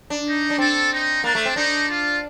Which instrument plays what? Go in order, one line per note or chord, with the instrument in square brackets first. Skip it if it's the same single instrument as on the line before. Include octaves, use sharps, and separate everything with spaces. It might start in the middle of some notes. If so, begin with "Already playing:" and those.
[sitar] D4
[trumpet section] D#4
[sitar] D4
[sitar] C4 [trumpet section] A4
[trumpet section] D#4
[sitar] A#3 [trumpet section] D4
[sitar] A3
C4
[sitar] D4 [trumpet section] D#4
[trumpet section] F4